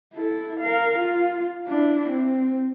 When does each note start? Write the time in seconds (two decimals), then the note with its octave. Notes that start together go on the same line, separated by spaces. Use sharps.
0.14 E4 A4
0.60 A#4 F5
0.98 F4
1.68 D4 E4
2.09 C4